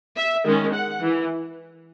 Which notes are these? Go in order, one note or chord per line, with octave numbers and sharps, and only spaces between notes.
E5
D#3 G#3 C#4
F#5
E3